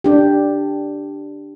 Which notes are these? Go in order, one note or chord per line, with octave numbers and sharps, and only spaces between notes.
D4 G4